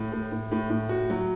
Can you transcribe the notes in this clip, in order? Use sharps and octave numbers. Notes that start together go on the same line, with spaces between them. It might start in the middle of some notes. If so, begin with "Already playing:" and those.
Already playing: A2
A2
A2
A2
A2
F#4
F#3